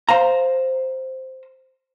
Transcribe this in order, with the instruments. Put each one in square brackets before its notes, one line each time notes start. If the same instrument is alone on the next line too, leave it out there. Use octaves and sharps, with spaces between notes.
[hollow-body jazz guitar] C5 F5 A#5